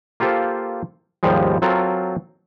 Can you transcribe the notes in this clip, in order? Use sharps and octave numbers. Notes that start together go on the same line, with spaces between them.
A#3 F4 G4 A4 C5
D#2 G#2 F3 G3 G#3
F#3 C4 F4 A4 A#4